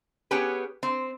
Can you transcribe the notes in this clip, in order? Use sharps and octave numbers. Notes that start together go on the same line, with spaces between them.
B3 C#4 G4 G#4 B4
C4